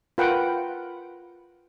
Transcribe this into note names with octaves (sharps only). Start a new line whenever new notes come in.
F4 A#4 B4 F#5 G5